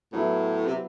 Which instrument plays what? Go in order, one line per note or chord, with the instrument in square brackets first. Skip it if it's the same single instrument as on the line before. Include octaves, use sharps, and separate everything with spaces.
[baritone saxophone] A2 [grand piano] F#3 B3 E4
[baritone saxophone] C3